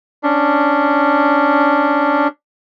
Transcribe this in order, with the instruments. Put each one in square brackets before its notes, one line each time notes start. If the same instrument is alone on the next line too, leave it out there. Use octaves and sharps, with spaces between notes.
[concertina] C#4 D4